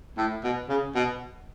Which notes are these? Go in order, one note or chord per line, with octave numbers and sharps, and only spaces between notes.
A2
B2
C#3
B2